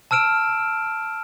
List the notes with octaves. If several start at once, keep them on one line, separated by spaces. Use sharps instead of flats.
A5 E6 F6 D7 E7